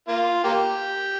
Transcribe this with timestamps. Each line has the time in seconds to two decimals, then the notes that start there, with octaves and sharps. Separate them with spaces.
0.08 A#3 F4
0.44 A#3 G4